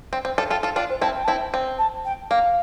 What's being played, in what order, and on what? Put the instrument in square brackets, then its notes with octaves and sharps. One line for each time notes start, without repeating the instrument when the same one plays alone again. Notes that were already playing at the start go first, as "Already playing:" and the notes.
[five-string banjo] C4
[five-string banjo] C4 [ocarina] G5
[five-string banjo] F4 A4
[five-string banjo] F4 A4 [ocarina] G5
[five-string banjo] F4 A4
[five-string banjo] D4 F4 [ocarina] G5
[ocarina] C5
[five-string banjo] C4 E4 [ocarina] A5
[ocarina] G5
[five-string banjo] C4 E4 [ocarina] A5
[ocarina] G5
[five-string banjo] C4
[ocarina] A5
G5
[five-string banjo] A#3 [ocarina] F5